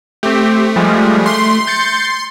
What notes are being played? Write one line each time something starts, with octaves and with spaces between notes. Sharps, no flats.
A3 C4 G4
F3 G3 G#3
C6
G6 A6 C#7